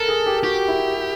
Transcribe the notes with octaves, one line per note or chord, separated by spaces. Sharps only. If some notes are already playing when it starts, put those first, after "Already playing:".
Already playing: A4 A#4
G#4
G4
F#4 G4
E4